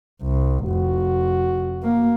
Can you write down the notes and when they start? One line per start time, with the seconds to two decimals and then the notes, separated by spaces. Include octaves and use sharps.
0.22 C2
0.66 F1 F#4
1.83 A#3